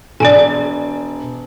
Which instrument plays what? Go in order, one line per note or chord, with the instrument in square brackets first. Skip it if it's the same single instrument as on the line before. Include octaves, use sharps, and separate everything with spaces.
[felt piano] E1 D7 [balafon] D5 G#5